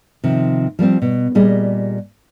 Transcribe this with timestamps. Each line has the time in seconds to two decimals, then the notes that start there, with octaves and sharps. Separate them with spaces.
0.24 C3 D#3 F3
0.79 F3 G3 B3 C4
1.02 B2
1.35 A#2 G3 G#4 D#5